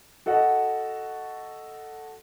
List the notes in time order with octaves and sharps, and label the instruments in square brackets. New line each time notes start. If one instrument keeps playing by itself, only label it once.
[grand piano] F#4 A4 D#5 F#5